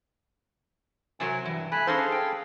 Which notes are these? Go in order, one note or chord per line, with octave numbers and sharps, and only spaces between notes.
C3 F#3 A#4 G#5
G2 E3
A3 G#5 B5 F#6
C#4 D#4 G#4 A4 C5 F5
G5